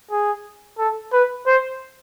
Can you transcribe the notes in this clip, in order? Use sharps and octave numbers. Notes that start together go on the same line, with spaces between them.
G#4
A4
B4
C5